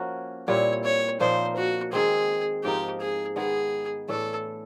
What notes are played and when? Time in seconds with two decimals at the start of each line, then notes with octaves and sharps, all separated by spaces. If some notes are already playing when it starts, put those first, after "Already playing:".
Already playing: F3 A#3 C#4 F#4
0.48 A#2 G3 C4 E4 C#5
0.84 C#5
1.20 A#2 F3 A#3 D#4 C5
1.56 F#4
1.92 D#3 G#3 C4 G#4
2.64 G#2 F3 A#3 D#4 G4
3.01 G#4
3.36 D#3 G#3 B3 G#4
4.08 A2 E3 A3 D4 A4